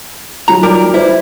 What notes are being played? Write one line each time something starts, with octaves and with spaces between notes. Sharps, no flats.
F#3 D#4 F4 A#5
G3 A#4 D5
E4 B4 C5 D5